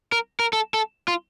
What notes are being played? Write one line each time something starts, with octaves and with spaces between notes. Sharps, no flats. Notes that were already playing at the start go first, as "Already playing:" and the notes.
A#4
A#4
A4
A4
F4